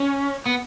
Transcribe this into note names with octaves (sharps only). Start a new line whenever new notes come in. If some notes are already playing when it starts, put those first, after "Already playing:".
Already playing: C#4
B3